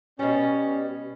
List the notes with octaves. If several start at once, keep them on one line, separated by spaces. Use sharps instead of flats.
B2 G3 C#4